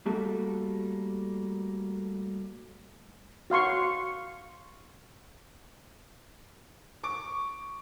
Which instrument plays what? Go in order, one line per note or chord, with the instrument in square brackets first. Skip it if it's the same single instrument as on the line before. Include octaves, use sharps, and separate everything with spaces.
[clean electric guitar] G3 A3 A#3 F#4 A4
[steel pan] F#4 F5 C6 C#6
[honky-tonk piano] C#6 D6 D7